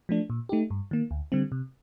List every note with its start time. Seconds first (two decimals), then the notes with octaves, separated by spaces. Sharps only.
0.09 F3 A3 D4
0.30 A#2
0.49 A3 D#4 G4
0.70 G2
0.91 D#3 A#3
1.11 D2
1.32 D3 G3 C4
1.52 C3